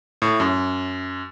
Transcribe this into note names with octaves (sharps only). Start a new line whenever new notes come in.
A2
F#2